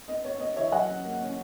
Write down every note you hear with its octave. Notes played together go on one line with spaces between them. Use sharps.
B3 D#5
B3 C#5
B3 D#5
E3 C#5 E5
E5
F#3 D#5 F#5
C#4
A#3
C#4